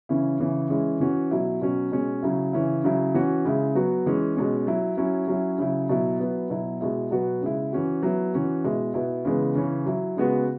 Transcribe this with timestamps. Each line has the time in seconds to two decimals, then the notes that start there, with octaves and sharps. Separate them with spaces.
0.09 C#3 E3 C#4 E4
0.39 C#3 E3 C#4 E4
0.70 E3 G#3 C#4 E4
1.00 E3 C#4 F#4
1.31 B2 F#3 E4
1.61 B2 F#3 C#4
1.92 B2 G#3 C#4
2.23 C#3 F#3 E4
2.53 C#3 E3 C#4 E4
2.84 C#3 F#3 E4
3.14 E3 C#4 F#4
3.45 C#3 G#3 E4
3.75 F#3 B3 F#4
4.06 E3 G#3 C#4
4.37 B2 G#3 C#4
4.67 F#3 E4
4.97 F#3 C#4 E4
5.28 F#3 C#4 E4
5.58 C#3 F#3 E4
5.89 B2 F#3 E4
6.20 F#3 B3 E4
6.50 B2 F#3 E4
6.81 B2 G#3 E4
7.11 B2 F#3 B3 F#4
7.41 C#3 G#3 E4
7.73 E3 C#4 F#4
8.03 F#3 B3 E4
8.34 E3 C#4 F#4
8.64 B2 G#3 E4
8.94 B2 B3 E4
9.25 C#3 E3 G#3 B3
9.55 C#3 E3 C#4
9.86 F#3 E4
10.16 C#3 G#3 B3 F#4